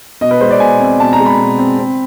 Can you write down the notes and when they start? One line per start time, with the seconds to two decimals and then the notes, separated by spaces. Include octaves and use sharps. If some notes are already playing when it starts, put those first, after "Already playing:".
0.21 B2 D#5
0.31 B4
0.41 G#3 C5
0.51 D5
0.60 B2 G#5
0.80 C4
1.00 B2 A5
1.13 A#5
1.20 G#3
1.26 B5
1.39 B2
1.59 C4
1.79 C4